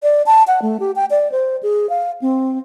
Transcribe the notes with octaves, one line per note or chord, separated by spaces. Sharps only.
D5
A5
F#5
A3
G4
G5
D5
C5
G#4
F5
C4